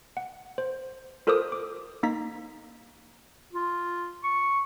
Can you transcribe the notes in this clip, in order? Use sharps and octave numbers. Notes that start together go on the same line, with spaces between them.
F#5
C5
F4 A4 A#4 C5 D6 D#6
D6
A#3 D#4 A#5 B6
F4
C#6